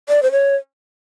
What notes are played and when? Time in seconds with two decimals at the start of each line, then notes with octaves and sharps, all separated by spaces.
0.09 D5
0.23 C5
0.32 C#5